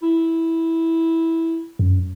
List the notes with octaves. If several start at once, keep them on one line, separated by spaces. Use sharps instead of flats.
E4
F#2